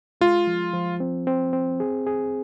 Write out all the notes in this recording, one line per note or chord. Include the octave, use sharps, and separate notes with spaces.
G#3 F4
F3
F3
C4
C4
C4
G#4
G#4